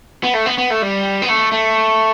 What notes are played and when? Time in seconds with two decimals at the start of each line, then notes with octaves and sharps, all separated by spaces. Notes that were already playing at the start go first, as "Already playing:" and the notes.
0.23 B3
0.34 A3
0.46 B3
0.58 B3
0.70 A3
0.82 G3
1.22 B3
1.29 A3
1.52 A3